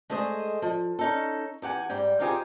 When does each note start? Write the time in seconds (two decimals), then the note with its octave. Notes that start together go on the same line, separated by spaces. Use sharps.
0.10 G#3 A3 G#4 C5 D#5
0.62 F3
0.99 C#4 D#4 A4
1.62 E2 G4 F#5 G#5
1.89 G#2 G3 G5
2.19 C4 D#4 F4 G4 G#4 C5